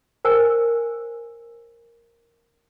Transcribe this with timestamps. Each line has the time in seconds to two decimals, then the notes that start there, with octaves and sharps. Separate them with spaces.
0.25 A#4 C5 G#5